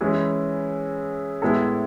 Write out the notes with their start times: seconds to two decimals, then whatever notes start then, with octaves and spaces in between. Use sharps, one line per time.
0.01 E3 G#3 C#4 E4
1.42 A2 G#3 B3 E4 A4